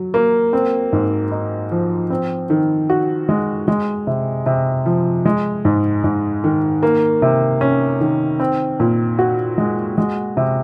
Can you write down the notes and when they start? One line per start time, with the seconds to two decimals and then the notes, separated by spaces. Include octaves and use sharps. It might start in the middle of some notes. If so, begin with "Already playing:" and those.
Already playing: F#3
0.14 A#3
0.53 C4
0.93 G#2
1.31 D#4
1.71 F3
2.10 C4
2.50 D#3
2.90 F#4
3.29 G#3
3.68 G#3
4.07 C3
4.46 C3
4.86 F3
5.26 G#3
5.65 G#2
6.04 G#2
6.44 D#3
6.83 A#3
7.22 C3
7.61 C#4
8.01 D#3
8.40 C4
8.80 A#2
9.19 F#4
9.58 G#3
9.98 G#3
10.37 C3